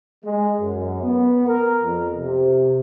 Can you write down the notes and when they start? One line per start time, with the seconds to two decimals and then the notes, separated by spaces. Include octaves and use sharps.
0.25 G#3
0.60 F#2
1.02 B3
1.47 A#4
1.82 F2
2.17 C3